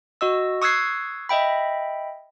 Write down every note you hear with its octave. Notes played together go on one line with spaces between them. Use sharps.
F#4 D#5 E6
C#6 D#6 E6 F#6 G#6 C7
D#5 E5 G5 B5